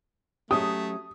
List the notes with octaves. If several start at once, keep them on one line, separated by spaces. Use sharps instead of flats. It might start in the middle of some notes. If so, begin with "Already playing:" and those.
F#3 A3 C#4 G4 D#6